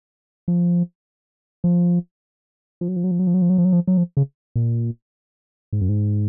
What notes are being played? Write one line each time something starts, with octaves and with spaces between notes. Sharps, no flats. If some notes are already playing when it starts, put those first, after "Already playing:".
F3
F3
F3
F#3
F3
F#3
F3
F#3
F3
F#3
F3
F#3
F3
F#3
F3
F#3
F3
C#3
A#2
G#2
F#2
G#2